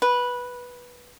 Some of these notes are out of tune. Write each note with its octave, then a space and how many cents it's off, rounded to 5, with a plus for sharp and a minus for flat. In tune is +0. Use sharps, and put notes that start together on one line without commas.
B4 -10